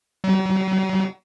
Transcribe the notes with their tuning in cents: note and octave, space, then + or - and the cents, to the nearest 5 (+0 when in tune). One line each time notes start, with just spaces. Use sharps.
F#3 +45